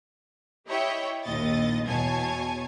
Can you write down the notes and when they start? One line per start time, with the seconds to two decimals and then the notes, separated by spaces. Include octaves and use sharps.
0.67 E4 G4 C#5 D#5 E5 G5
1.24 A#1 D#2 D#5 A6
1.87 E2 B2 C#5 G#5 A5 G#6